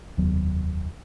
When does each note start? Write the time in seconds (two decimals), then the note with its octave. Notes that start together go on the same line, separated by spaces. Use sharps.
0.18 F1 D#2 F#3 B3